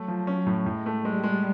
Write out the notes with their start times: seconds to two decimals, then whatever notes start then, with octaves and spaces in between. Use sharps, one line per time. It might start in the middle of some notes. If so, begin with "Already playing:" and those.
Already playing: F#3 A3
0.08 F3
0.27 C#4
0.47 A2
0.66 A2 G#3
0.86 A3
1.05 G3 G#3
1.24 G#3